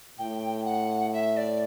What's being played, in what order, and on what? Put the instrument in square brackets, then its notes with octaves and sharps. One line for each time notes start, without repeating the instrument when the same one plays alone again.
[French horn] A2 [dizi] G5
[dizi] F#5
E5
D5